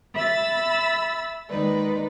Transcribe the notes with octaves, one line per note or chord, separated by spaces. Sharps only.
E5 B5 E6 A6
D#2 G#3 D#4 B4 D5